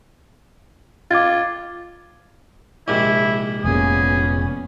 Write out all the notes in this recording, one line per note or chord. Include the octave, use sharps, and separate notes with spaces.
F4 D6 G#6 A6
A#1 G#2 C3 E4
F1 A#2 B3 C#4 G#4